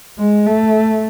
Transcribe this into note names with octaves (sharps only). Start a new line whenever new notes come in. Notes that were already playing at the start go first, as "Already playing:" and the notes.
G#3
A3